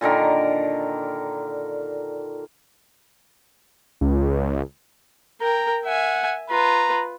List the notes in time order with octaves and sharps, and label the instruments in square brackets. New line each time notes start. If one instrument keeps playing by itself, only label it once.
[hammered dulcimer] A#2 D3 D#3 A#4
[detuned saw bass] C#2
[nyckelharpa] A#4 G5 [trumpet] A#5
[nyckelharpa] E5 G#5 [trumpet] F#5
[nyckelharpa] F4 B4 [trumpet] A#5